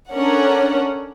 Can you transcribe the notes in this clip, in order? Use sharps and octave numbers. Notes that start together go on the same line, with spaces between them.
C#4 D4 A4 A#4 C#5 F#5